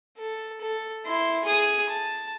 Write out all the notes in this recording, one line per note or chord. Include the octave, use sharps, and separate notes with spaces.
A4
A4
E4 C6
G#4 D#6
A5